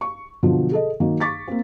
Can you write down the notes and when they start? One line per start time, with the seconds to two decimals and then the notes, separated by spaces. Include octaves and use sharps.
0.01 C#6
0.43 B2 D3 F3 F#3
0.71 G#4 A4 D#5
1.00 D#3 F#3 A#3
1.20 C#6 D6 A6 B6
1.48 A#3 C4